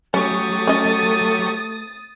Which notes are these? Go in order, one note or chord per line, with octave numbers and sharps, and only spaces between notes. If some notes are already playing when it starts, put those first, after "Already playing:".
F#3 A3 C#4 G4 C#6 D#6 A6
C#4 D#5